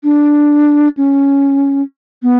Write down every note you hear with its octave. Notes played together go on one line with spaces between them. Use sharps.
D4
C#4
B3